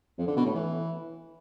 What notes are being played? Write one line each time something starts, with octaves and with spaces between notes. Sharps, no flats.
F2
D3
B2
A2
E3